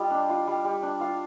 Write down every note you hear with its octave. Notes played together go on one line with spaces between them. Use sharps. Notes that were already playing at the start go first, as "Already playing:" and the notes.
Already playing: G3 F4 D#5
D4
F4
G3
G3
D4
F4 F5